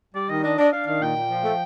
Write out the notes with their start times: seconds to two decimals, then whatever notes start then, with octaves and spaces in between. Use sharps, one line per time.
0.15 G3 D5
0.29 D#3 D#5
0.44 D4 D#5
0.58 D4 D#5
0.72 D4 F5
0.87 D#3 F5
1.01 A#2 G5
1.16 A#2
1.30 F3
1.45 A3